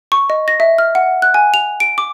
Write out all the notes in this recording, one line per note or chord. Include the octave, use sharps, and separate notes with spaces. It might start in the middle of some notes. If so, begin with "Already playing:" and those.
C#6
D#5
A#6
E5
F6
F#5
F#6
G#5
F7
D7
D6